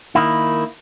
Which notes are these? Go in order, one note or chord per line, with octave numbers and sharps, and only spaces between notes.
D#3 A#3 E4